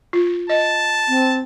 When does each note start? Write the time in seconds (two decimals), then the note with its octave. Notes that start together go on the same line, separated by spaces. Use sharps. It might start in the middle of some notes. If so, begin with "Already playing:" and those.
0.13 F4
0.50 D#5 A5
1.08 C4